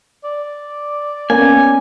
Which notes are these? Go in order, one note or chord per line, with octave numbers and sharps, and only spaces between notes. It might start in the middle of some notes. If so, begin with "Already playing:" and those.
D5
A#3 B3 C#4 G#5